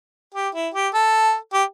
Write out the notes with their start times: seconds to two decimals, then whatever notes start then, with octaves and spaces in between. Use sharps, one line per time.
0.34 G4
0.54 E4
0.74 G4
0.94 A4
1.53 G4